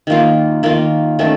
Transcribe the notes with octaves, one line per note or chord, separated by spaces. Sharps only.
D#3 A#3 F4
D#3 A#3 F4
D#3 A3 C#4 A4